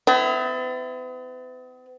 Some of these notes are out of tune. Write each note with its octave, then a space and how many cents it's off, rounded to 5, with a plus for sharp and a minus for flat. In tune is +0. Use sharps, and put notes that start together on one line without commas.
B3 +45 E4 +0